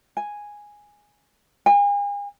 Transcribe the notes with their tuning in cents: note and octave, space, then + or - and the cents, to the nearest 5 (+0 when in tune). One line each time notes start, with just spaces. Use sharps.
G#5 -5
G#5 -40